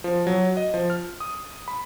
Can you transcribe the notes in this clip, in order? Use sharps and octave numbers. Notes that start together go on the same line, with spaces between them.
F3
F#3
D#5
F3
F6
D#6
B5